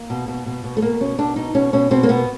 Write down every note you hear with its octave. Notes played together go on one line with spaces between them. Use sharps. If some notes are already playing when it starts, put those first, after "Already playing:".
Already playing: A#3
B2
B2
B2
B2
A3
B2 A#3
B2 C#4
B2 D4
B2 D#4
B2 C#4
B2 C#4
B2 C4
A#3
B2 B3